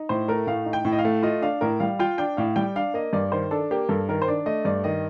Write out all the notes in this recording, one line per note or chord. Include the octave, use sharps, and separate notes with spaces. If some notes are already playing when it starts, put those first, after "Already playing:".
Already playing: D#4
A2 C5
A3 A#4
A2 F5
D#4
G5
A2
D#5
F5
A3
F4 D#5
D4 F5
A2 A#4
G3 F5
F4 G5
D4 G5
A2 F5
G3 G5
D4 F5
A#3 D#5
G2 D5
D#3 C5
D4 A4
A#3 G4
G2 A4
D#3 A#4
C5
D4 D5
A3 D#5
G2 D5
D#3 D#5